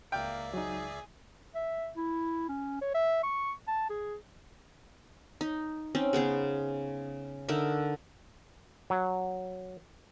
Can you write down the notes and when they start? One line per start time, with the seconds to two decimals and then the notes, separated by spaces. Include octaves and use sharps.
0.12 C#2 A#3 D5 E5 G5 F6
0.54 F#3 D#4 G#4
1.55 E5
1.96 E4
2.48 C#4
2.81 C#5
2.94 E5
3.23 C#6
3.67 A5
3.90 G#4
5.41 D#4
5.95 C4 C#4 D#4
6.13 C#3 B3 G#4 C5
7.48 D3 D#4 A#4 E5
8.90 F#3